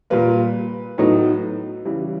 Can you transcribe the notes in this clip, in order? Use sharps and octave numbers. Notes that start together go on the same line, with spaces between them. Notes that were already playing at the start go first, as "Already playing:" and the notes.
A#2 G3 A#3 B4
A2 F#3 B3 D#4
C#3 E3 G3